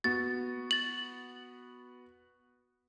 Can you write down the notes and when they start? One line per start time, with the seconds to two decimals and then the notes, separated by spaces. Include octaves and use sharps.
0.04 B3 F#4 A6
0.71 A6 F#7